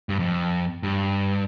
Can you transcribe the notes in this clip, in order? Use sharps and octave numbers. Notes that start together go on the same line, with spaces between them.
G2
F2
G2